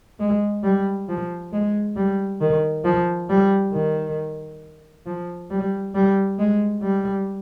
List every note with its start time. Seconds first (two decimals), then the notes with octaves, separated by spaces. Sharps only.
0.20 G#3
0.63 G3
1.09 F3
1.52 G#3
1.96 G3
2.41 D#3
2.84 F3
3.29 G3
3.73 D#3
5.06 F3
5.50 G3
5.95 G3
6.39 G#3
6.82 G3